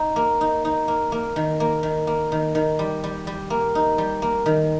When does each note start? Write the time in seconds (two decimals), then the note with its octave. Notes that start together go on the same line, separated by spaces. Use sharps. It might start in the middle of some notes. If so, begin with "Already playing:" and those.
Already playing: D#4
0.16 A#3
0.41 D#4
0.65 D#4
0.88 A#3
1.12 A#3
1.36 D#3
1.60 A#3
1.83 D#3
2.07 A#3
2.32 D#3
2.55 D#3
2.79 G3
3.04 G3
3.27 G3
3.50 A#3
3.75 D#4
3.98 G3
4.22 A#3
4.46 D#3